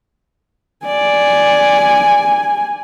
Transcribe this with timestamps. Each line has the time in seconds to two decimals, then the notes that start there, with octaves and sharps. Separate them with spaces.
0.86 D5 G#5